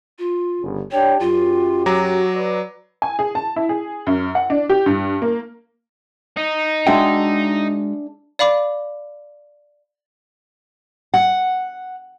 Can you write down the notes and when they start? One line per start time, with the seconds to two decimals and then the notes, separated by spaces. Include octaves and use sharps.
0.19 F4
0.62 G1 C#3
0.91 D4 G4 C#5 G5
1.20 F#2 F4 G4
1.86 F#3 F#4 A#5 D6
2.34 B4 D5
3.02 G#5
3.19 G#4
3.35 A5
3.56 E4
3.69 G#4
4.07 F#2
4.35 F#5
4.50 D4
4.69 G4
4.86 G2
5.22 A#3
6.37 D#4
6.87 G#3 D4 F#4 G#4 E5 G5
8.39 D5 F5 B5 D6
11.14 F#5